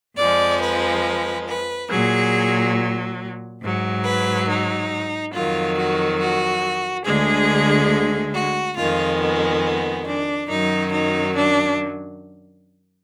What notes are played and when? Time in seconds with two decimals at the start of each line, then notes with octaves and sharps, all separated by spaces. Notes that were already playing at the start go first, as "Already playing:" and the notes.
0.17 F2 F3 G#3 D5
0.60 B4
1.47 B4
1.89 A#2 F#3 G#4
3.62 G#2 F#3
4.05 B4
4.48 D#4
5.33 F2 D#3 F#3 F4
5.77 F#4
6.20 F#4
7.05 D2 D3 G#3 G#4
8.34 F#4
8.77 F2 D#3 G#3 F4
9.21 B3
9.64 B3
10.06 D4
10.49 F#2 D#3 F#3 D#4
10.92 D#4
11.36 D4